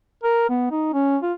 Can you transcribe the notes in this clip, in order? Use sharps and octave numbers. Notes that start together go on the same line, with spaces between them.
A#4
B3
D#4
C#4
F4